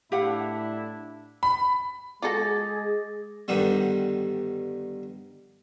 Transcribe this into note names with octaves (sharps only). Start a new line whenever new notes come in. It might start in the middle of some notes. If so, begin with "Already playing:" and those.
A2 D4 E4 G4 F5 F#5
B5
G#3 F4 F#4 G#4 A4 D6 A6 A#6
G2 D3 D#3 G3 B3